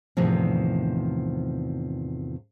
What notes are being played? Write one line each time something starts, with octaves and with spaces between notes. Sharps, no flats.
E2 A2 C3 D#3 F3